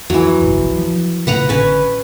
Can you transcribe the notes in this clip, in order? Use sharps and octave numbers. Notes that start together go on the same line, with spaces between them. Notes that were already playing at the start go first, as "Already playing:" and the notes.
F2 E3 F#3
G1 C2 F2
F3
A2 C#3 B4 F#5 A#5
A1 D3 C#4 B4